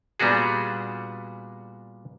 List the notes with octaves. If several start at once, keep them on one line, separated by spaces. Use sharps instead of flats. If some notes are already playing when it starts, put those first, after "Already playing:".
A#2 G3 B3 D4 F#4 G#4